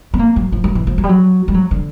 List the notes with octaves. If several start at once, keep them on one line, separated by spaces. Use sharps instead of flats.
B3
A#3
F#3
F3
F#3
E3
F3
F#3
G3
F#3
G3
F#3
D3